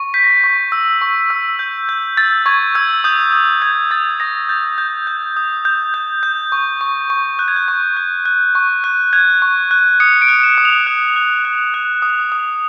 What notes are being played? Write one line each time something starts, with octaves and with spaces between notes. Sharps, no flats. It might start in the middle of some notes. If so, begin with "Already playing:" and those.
Already playing: C#6
G6 B6
A#6
B6
C#6
E6
C#6
E6
G6
G6
E6 A6
C#6 G#6
E6 G#6
D#6 G6
D#6
G6 G#6
D#6 A6
D#6 A#6
G6 A6
G6
G6
D#6
G6
G6
G6
C#6
C#6
C#6
F#6 G6
G#6
G6
C#6
F#6
F#6
C#6
F#6
F#6 G#6
C#6
F#6
D#6 C#7
D7
F#6
E7
D#6
F7
F#6
F#6
F#6
F#6
D#6
D#6